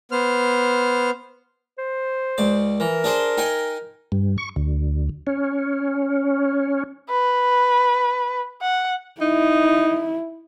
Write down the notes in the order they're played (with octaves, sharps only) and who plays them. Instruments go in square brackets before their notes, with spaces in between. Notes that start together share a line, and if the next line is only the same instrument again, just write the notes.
[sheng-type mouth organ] B3 C5 F6
[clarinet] C5
[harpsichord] C#2 D5
[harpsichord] E3 [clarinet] A#4
[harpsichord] D4 G#4 C5
D#4 G5 G#5
[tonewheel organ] G2
C#6
D2
C#4
[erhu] B4
F#5
[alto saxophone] D#4 [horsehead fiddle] E4